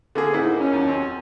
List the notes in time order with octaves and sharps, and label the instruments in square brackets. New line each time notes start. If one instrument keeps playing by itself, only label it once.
[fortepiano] D3 A#3 G#4
[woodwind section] G#2 D#4 [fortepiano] A#3 E4 F#5
[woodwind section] F2 F#3 C#4
[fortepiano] D#2
C4